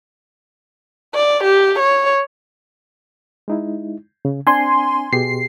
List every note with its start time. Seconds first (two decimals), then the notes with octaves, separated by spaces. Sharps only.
1.14 D5
1.44 G4
1.79 C#5
3.48 G#3 D#4 E4
4.25 C#3
4.47 C4 D4 G#5 C6
5.13 B2 G4 G#4 C7